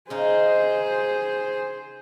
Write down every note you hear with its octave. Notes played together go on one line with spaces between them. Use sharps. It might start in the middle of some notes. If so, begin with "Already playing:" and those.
C#3 D#4 G#4 C5